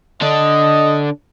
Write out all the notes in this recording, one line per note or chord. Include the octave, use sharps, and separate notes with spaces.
D3 D4 D#5